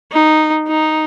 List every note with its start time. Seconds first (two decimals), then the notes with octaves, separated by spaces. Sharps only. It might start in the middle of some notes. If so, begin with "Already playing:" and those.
0.12 D#4
0.68 D#4